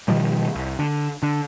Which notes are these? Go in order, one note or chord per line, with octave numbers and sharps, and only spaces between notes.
B2 D#3 F3 G3
C2
D3
D3